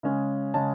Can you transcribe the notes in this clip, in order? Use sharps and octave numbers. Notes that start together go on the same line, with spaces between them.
C#3 G#3 C#4
C#3 G#3 C#4 A5